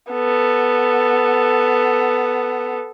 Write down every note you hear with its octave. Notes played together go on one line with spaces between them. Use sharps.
B3 A4